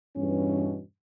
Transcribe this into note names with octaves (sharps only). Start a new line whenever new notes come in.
E2 G2 B2 E3 C#4